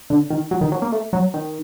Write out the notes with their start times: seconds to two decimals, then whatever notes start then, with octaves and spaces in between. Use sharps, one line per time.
0.10 D3
0.30 D#3
0.51 F#3
0.61 D#3
0.72 F#3
0.82 A#3
0.92 A3
1.13 F#3
1.34 D#3